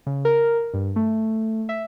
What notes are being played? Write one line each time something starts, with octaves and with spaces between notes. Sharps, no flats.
C#3
A#4
G2
A3
E5